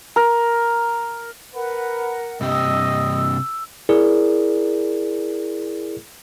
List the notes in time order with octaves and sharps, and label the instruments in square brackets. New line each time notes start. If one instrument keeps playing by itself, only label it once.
[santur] A#4
[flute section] A#4 F#5 [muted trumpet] B4
[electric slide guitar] G2 C3 G4 [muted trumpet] D#5 [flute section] E6
[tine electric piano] E4 G#4 A#4 D5